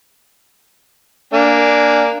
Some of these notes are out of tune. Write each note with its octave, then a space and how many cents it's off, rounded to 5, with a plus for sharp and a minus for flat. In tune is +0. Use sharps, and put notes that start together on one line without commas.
A#3 -5 D4 +0 G#5 +0